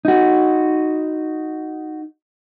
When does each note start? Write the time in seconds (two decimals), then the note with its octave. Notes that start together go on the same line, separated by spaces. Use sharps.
0.05 D#4 F#4